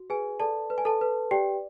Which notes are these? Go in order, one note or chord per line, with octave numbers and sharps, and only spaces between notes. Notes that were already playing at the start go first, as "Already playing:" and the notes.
Already playing: F#4
G#4 B4 G#5
A4 D5 A5
B4
G#5
A4 A5
B4
G4 D5 G5